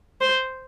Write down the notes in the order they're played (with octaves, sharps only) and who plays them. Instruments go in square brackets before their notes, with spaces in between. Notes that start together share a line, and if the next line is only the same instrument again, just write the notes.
[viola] C5